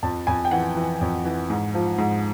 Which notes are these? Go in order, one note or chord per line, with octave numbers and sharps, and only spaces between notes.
F2 A5
F2 G#5
G5
E3 F#5
E3
F2
E3
G#2
F3
G#2